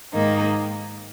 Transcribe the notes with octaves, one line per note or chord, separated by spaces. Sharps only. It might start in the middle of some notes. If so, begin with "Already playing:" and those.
G#2 D#3 A#3 D#4